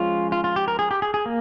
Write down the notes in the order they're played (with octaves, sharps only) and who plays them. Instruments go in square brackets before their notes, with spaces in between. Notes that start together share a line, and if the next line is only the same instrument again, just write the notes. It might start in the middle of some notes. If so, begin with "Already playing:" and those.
Already playing: [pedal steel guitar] F3 G#3 C#4 F4
F4
F4
G4
A#4
G#4
G4
G#4
G#4
A#3